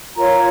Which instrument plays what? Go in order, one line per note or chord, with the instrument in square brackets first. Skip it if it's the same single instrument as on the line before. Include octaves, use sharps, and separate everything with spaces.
[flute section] F4 A#4 C#5 A#5